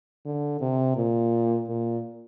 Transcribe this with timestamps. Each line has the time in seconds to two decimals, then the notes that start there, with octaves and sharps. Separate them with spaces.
0.25 D3
0.61 C3
0.96 A#2
1.68 A#2